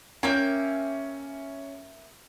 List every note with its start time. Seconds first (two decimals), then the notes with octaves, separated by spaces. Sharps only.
0.23 A#3 C#4 E5 G5